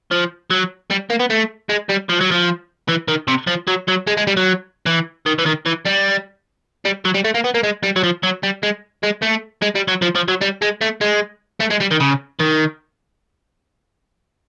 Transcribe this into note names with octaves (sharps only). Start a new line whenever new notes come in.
F3
F#3
G3
A#3
B3
A3
G#3
G3
F3
F#3
F3
E3
D#3
C3
F3
F#3
F#3
G#3
G#3
G3
F#3
E3
D#3
E3
D#3
E3
G3
G3
F#3
G3
A3
A#3
B3
A#3
G#3
G3
F#3
F3
F#3
G3
G#3
G#3
A3
G#3
G3
F#3
F3
F3
F#3
G3
G#3
A3
G#3
A3
G#3
G3
D#3
C#3
D#3